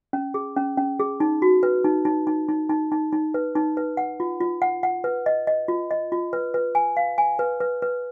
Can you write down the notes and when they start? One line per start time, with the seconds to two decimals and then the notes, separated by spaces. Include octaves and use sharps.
0.13 C#4
0.34 G#4
0.57 C#4
0.78 C#4
1.00 G#4
1.20 D#4
1.42 F#4
1.63 B4
1.84 D#4
2.05 D#4
2.27 D#4
2.48 D#4
2.69 D#4
2.92 D#4
3.12 D#4
3.34 B4
3.55 D#4
3.77 B4
3.97 F#5
4.20 F4
4.41 F4
4.62 F#5
4.83 F#5
5.04 B4
5.26 D#5
5.47 D#5
5.68 F4
5.91 D#5
6.12 F4
6.33 B4
6.54 B4
6.75 G#5
6.97 F5
7.18 G#5
7.39 B4
7.60 B4
7.82 B4